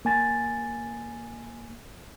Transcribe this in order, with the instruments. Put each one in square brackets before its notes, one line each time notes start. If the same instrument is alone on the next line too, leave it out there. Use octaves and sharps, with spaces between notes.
[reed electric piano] A#3 G#5 A6